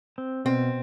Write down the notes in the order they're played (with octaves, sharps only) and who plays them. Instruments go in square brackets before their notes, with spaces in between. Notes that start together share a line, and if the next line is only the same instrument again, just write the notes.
[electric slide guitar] C4
[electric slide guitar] B2 [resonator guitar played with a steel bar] C4